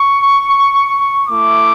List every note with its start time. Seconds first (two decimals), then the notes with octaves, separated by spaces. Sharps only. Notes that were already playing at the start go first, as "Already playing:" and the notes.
Already playing: C#6
1.29 A3 E4 D6